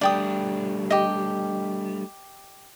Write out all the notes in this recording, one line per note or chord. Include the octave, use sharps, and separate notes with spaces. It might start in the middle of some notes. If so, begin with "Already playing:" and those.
G3 A3 D4 D5 G5 D#6
G4 D#5